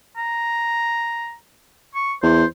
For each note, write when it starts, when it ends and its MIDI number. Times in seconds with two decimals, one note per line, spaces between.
0.17 1.35 82
1.95 2.14 85
2.22 2.44 40
2.22 2.46 72